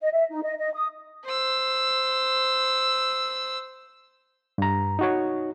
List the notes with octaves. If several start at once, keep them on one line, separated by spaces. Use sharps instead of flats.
D#5
E5
D#4
D#5
D#5
D#6
C5 E6
G2 A#5
D#4 F#4 C#5